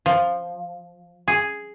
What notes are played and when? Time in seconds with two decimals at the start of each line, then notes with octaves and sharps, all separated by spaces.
0.06 F3
1.28 G#4